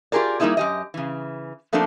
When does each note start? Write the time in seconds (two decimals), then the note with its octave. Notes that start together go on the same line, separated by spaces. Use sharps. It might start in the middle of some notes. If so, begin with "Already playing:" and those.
0.12 F4 G4 G#4 A#4 D5
0.40 G3 A#3 B3 D#4 E4 G#4
0.57 F#2 G4 D#5
0.94 C#3 E3
1.73 F3 A3 A#3 C4 D4 A4